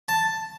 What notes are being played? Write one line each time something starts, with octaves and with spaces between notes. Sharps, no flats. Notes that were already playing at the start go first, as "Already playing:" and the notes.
A5